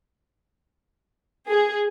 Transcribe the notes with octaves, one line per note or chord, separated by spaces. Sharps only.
G#4